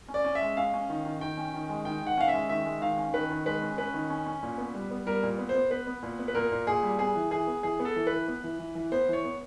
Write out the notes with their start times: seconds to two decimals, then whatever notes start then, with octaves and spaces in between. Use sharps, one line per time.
0.09 C#4
0.14 D5
0.25 C#4
0.35 E5
0.41 G#3
0.57 C#4 F5
0.74 C#4
0.89 D#3
1.05 D#3
1.21 D#3 G5
1.37 C#4
1.54 D#3
1.69 G#3
1.85 D#3 G5
2.02 D#3 F#5
2.17 C#4 F5
2.28 E5
2.33 G#3
2.49 D#3 E5
2.65 G#3
2.81 D#3 F5
2.97 C#4
3.13 D#3 B4
3.30 D#3
3.46 G#3 B4
3.62 C#4
3.78 C#4 B4
3.94 D#3
4.10 C#4
4.26 C#4
4.43 A#2
4.58 B3
4.74 G3
4.91 B3
5.07 G3 A#4
5.23 A#2
5.38 B3
5.49 C5
5.55 B3
5.70 B3 B4
5.87 B3
6.03 A#2
6.19 B3
6.28 B4
6.35 A#2 A#4
6.52 A#2
6.67 A#2 G#4
6.83 G3
6.99 B3 G#4
7.15 E3
7.31 E3 G#4
7.47 B3
7.63 E3 G#4
7.80 B3
7.85 A4
7.96 E3
8.07 E3 B4
8.28 B3
8.44 E3
8.59 E3
8.75 E3
8.92 B3 C5
9.08 E3 C#5
9.24 B3